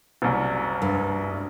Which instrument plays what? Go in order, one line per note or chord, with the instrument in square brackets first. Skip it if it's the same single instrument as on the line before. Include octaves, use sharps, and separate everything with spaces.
[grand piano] F#1 C2
[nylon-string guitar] G2